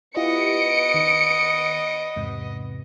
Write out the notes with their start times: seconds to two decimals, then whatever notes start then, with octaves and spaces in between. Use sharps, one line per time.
0.17 B3 E4 F4 G4 D#5 C#7 D7
0.94 D#3
2.16 E2 G#2 C3